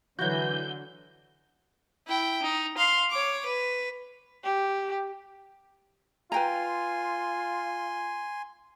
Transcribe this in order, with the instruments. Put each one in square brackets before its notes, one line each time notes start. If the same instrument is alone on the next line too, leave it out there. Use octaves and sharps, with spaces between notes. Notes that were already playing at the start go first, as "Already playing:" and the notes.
[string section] D3 [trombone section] E3 [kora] F#3 F#4 [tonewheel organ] G6
[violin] E4 G5
D#4
F5 C6
C#5 D6
B4
[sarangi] G4
[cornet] F4 [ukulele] B4 G5 A#5 [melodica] G#5 C6